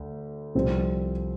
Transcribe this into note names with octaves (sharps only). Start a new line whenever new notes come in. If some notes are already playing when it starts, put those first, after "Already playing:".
Already playing: D2
C2 C3 F3 C4